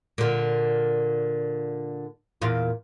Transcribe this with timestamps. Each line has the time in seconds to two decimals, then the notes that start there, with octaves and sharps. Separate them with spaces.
0.18 A#2 D3
2.42 E2 A#2 F4